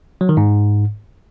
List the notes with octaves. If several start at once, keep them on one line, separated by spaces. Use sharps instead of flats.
F#3
D#3
G#2